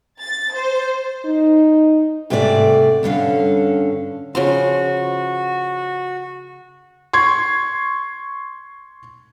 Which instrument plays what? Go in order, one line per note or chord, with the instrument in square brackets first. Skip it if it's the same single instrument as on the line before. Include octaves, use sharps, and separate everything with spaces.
[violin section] A6
C5
[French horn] D#4
[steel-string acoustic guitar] G#2 C3 A3 C5 D5
G2 D3 C#4 F5
[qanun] C#3 F3 C6 [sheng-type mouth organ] F#4
[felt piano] C6 C#6 G#6